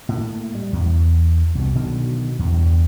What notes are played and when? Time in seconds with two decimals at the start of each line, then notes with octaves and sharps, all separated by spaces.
0.09 A2 A#3
0.55 G3
0.73 E2
1.55 C2 B2
1.75 B2 D3 D#3 F#3
2.39 E2 G2